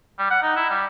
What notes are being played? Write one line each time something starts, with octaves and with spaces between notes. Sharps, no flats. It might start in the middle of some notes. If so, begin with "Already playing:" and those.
G3
F#5
D#4
E4
G3